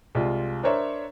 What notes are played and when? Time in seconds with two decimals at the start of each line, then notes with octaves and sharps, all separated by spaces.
0.15 C2 G#3 F4
0.63 D4 A#4 C5 C#5 E5